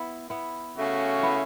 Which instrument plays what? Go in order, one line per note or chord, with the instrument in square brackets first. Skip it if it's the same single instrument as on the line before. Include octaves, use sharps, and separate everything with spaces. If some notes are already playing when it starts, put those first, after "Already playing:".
Already playing: [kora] B3 E4
B3 E4
[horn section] C#3 A3 C#4 F#4
[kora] B3 E4